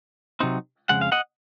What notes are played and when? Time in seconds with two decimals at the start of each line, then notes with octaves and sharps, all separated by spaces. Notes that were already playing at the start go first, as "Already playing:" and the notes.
0.40 C3 F#3 C4 D#4
0.89 F2 C#3 G#3 F#5
1.01 F5
1.12 D#5 F#5